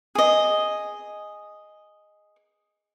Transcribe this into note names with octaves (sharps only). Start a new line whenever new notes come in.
G#4 D#5